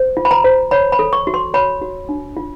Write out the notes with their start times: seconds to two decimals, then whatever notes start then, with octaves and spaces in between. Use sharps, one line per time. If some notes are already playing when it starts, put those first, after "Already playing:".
Already playing: C5
0.17 F4
0.25 B5
0.31 A#5
0.44 C5
0.71 C#5 B5
0.92 B5
0.99 A4
1.13 C#6
1.27 F#4
1.34 C6
1.54 C#5 B5
1.81 F#4
2.09 D4
2.37 F4